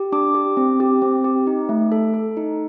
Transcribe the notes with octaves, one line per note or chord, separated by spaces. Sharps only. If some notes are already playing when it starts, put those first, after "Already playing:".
Already playing: G4
D4 D6
G4
C4
G4
C4
G4
D#4
A3
A4
A4
D#4